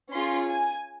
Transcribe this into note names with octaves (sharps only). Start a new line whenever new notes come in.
C#4 F4 G#4 C6
G#5